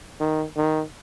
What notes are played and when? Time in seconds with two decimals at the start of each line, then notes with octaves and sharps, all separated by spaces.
0.20 D#3
0.56 D#3